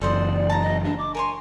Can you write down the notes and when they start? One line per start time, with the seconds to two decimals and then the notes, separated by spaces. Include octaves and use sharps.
0.01 F#1 F#2 E3 A4 C5 D5 D#5
0.50 A5 A#5
0.62 D#5
0.84 D4
0.99 D6
1.15 A#4 C#5 G#5 C6